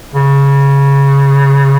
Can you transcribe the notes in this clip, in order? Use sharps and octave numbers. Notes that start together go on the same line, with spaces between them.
C#3